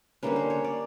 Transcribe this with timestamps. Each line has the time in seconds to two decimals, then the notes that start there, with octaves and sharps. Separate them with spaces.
0.23 D3 G3 A#3 C#4 B4
0.36 C5
0.50 C#5
0.64 D5